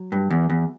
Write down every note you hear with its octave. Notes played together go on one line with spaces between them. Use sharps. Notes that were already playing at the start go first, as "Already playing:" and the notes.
Already playing: F#3
G2
E2
E2